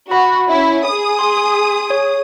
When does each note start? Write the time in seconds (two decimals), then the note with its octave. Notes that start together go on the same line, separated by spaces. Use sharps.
0.11 F#4 B5
0.49 C#4 E4
0.87 G#4 D#6
1.19 G#5 C6
1.90 C#5